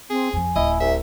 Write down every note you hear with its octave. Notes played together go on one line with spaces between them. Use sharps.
C4 G#4
F2 F3 G#5
D1 E4 D#5
C2 E5